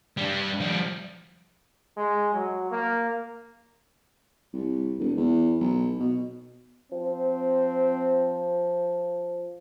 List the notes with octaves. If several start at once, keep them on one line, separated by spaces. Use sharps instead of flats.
G3 D4
F3 G3
G#3
F#3
A#3
C2
E1
E2
B1
B2
F3 C4